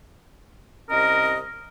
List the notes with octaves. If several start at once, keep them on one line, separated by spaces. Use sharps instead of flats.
C2 C#4 A#4 D#5